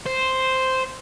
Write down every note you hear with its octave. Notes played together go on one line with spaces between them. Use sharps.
C5